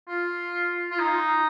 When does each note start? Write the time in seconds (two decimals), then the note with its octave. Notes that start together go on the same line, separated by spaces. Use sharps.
0.08 F4
0.91 F4
0.99 D#4